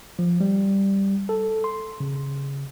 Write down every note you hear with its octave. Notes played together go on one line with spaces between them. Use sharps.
F3
G3
A4
C6
C#3